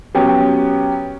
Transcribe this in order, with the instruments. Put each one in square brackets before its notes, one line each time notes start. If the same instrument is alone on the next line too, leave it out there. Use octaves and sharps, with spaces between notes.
[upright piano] F#3 B3 C#4 G4